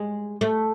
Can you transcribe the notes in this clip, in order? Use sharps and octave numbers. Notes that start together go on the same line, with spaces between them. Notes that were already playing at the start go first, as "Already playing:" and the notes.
Already playing: G#3
A3